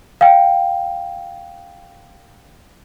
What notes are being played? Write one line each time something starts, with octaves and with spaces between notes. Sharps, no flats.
F5 G5